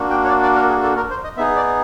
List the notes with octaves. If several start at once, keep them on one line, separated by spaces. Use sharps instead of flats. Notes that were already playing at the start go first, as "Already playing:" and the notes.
Already playing: A#3 D4 F#4
G5
C#5
D5
D5
A#4
G#4
A4
A#4
C5
D#5
B3 D#4 G#4 E5
D5